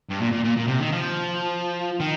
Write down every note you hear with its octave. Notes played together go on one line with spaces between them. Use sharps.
G2
A#2
A#2
A#2
A#2
C3
D#3
F3
D#3